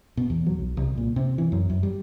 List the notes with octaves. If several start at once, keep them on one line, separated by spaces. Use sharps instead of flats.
B2
E2
F#3
B1
C2
A#2
C3
E3
F#2
F#2
G3